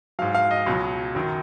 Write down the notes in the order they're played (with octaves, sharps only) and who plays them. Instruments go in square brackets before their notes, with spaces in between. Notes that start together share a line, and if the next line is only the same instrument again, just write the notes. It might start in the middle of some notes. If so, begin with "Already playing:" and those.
[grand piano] G#2 F#3 F5
F5
D#5
C#2 B2 F#3
F#2 D#3 F#3